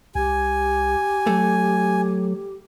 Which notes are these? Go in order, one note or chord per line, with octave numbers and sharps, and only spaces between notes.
C2 G4 G#5
F#3 A3